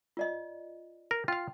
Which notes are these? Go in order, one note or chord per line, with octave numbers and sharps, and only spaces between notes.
F4 D5 D#5
A#4
F4 F5 G5